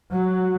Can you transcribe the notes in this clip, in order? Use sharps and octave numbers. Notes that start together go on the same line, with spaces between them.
F#3 F#4